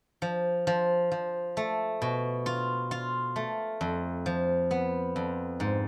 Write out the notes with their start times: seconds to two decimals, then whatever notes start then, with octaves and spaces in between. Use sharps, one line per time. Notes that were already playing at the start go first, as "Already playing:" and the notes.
0.22 F3
0.67 F3
1.11 F3
1.57 A3
2.02 B2
2.46 F4
2.91 F4
3.36 A3
3.81 F2
4.26 F3
4.71 B3
5.16 F2
5.60 G#2